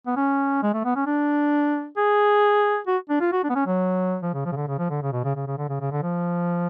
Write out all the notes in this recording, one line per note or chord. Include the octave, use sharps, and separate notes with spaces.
B3
C#4
G#3
A3
B3
C#4
D4
G#4
F#4
D4
F4
F#4
D4
B3
C#4
F#3
F3
C#3
F3
C#3
D3
C#3
F3
D3
C#3
B2
C#3
C#3
C#3
D3
C#3
C#3
D3
F3